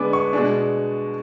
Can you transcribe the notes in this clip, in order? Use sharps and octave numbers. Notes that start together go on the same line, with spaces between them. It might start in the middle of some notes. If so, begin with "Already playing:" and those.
Already playing: D3 G#3 B3 D4 D6
C#6
B2 G#3 D4